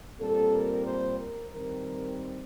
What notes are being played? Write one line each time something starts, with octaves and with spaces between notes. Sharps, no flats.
A#2 G3 C4 A4
A#4
C5
A#4
D#3 G3 C4 A#4